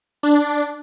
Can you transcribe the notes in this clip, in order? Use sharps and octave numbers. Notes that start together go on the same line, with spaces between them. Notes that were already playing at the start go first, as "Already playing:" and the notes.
D4